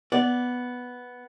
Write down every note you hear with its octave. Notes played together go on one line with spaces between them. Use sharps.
B3 D5